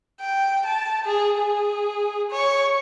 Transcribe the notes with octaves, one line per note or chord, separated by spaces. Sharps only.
G5
A5
G#4
G#4
C#5